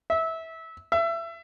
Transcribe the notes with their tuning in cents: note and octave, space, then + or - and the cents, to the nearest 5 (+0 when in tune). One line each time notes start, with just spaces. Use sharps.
E5 -20
E5 +25